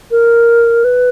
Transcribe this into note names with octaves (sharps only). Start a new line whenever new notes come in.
A#4
B4